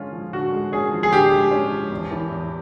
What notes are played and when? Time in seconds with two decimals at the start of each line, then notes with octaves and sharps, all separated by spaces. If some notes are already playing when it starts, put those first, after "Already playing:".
Already playing: D3 G#3 C#4 F4
0.12 F3
0.33 D3 F#4
0.52 G#3
0.72 C#4 G#4
0.91 F3
1.03 G#4
1.11 D3 G4
1.32 G#3
1.51 C#4
1.72 F3
1.91 E2
2.11 E3
2.30 E2